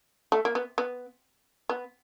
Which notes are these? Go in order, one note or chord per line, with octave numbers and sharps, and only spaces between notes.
A3
A#3
B3
B3
B3